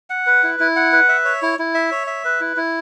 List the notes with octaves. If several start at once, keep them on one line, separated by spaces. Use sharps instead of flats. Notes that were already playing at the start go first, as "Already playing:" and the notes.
F#5
B4
E4
E4
F#5
B4
E5
C#5
E4
E4
E5
C#5
E5
B4
E4
E4